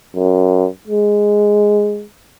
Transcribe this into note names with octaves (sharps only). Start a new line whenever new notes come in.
F#2
G#3